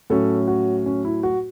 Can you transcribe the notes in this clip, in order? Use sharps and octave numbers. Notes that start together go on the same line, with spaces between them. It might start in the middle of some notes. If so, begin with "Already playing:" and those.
A2 F#3 C#4 A4
F#4
C#4
E4
F#4